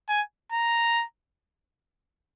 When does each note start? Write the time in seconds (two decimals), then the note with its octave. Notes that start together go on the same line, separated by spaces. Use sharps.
0.09 G#5
0.52 A#5